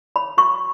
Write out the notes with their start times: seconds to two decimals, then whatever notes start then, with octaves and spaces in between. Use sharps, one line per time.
0.16 C#5 B5
0.37 F#4 C#6